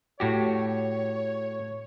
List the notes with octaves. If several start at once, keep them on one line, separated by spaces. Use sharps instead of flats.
A2 F#4 G4 C#5